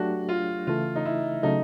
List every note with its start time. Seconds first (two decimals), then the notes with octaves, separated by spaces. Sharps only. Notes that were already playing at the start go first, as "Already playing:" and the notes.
Already playing: F#3 A3 D4 F#4 G4
0.29 F4
0.67 C#3 E3 A3 F4
0.95 D#4
1.05 E4
1.43 C#3 F#3 A3 D#4